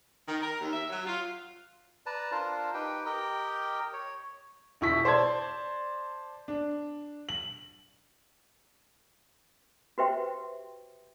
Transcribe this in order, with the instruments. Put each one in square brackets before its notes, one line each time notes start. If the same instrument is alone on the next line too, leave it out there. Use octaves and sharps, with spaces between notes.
[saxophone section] D#3
A#4
D#2
E5
F#3
F4
[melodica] B4 D5 A5 A#5
D4 F4 A#4 C5
D#4 G4 B4 G5
G4 A#4 D#5 G5
C#5
[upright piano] E1 E4 C#6 B6
C5 D5 A5 G#6
D4
F#7
[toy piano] F#4 G4 B4 C5 E5 G5